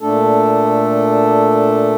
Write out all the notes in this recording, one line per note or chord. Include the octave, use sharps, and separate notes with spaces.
A#2 A3 D4 A4